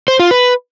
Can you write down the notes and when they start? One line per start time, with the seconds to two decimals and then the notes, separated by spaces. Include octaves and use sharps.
0.08 C5
0.19 F4
0.31 B4